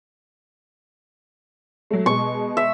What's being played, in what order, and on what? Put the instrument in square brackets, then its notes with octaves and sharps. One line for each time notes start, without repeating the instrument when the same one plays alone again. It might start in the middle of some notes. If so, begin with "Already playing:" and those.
[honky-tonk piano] F#3 A3
[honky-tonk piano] B2 G#3 [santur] C#6
[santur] E5